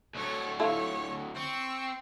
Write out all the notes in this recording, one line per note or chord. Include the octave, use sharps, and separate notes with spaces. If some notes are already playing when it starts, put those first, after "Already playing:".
D2 F#3 A4 C#5
E4 F4 A4 C#5
C4 C#6 E6